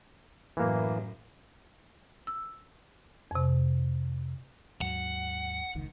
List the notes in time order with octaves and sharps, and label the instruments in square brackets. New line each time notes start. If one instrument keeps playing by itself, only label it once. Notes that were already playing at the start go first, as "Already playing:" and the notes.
[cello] F#2 A2 [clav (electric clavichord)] E3 A#3
[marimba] E6
F2 C3
[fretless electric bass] D#2 G#2 F#3 [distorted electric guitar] F#5
[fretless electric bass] F1 C#2 D#3